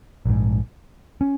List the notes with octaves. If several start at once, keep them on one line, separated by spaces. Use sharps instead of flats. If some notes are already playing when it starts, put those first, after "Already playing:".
A#1 G#2
C#4